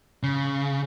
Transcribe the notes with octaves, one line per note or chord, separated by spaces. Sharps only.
C#3